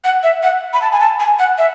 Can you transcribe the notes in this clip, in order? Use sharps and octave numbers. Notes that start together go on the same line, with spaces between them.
F#5
E5
F#5
B5
A5
G#5
A5
G#5
F#5
E5